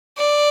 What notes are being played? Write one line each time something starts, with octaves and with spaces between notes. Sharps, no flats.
D5